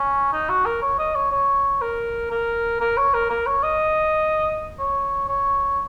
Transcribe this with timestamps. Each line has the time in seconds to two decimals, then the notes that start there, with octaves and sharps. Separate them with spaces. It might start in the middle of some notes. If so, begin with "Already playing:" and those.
Already playing: C#4
0.33 D#4
0.49 F#4
0.66 A#4
0.82 C#5
0.98 D#5
1.15 C#5
1.32 C#5
1.81 A#4
2.31 A#4
2.80 A#4
2.97 C#5
3.14 A#4
3.30 A#4
3.46 C#5
3.63 D#5
4.79 C#5
5.28 C#5